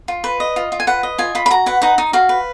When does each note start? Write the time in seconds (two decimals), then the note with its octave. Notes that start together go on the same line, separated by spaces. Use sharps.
0.08 F4
0.24 B4
0.40 D#5
0.56 F4
0.72 F4
0.80 G#5
0.87 B4 F#5
1.03 D#5
1.18 F4 G#5
1.35 F4 B5
1.46 B5
1.51 F#4 A#5
1.66 B4 F#5
1.82 D#4 F#5
1.98 D#4
2.13 F#4 F5
2.29 B4